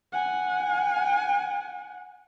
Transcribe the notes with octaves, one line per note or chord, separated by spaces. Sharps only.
F#5 G#5